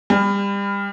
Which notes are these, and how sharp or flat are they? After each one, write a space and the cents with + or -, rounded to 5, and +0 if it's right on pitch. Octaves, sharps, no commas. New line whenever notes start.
G3 +30